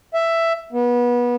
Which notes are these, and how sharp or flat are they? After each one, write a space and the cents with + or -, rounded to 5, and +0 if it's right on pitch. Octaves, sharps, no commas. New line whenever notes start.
E5 +10
B3 -25